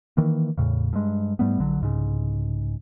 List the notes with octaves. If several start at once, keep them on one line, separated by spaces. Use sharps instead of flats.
D#3 E3 A#3
E2 A2 C#3
G2 G#3
G#2 G3 A3 B3
A#1 D3 F#3
C2 G#2 C#3